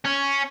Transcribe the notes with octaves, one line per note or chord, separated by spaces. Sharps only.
C#4